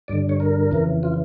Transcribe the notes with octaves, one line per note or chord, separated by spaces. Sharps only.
G2 D3 D5
C#5
A#4
F2 C#3 E3
F4